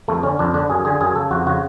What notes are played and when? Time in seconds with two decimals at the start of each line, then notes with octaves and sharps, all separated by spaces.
0.08 F2 A3
0.23 D3 C#4
0.39 F2 D4
0.54 D3 D4
0.69 F#2 G#4
0.85 D3 G#4
1.01 F#2 G#4
1.15 C#3 A4
1.31 F2 F#4
1.46 C#3 F#4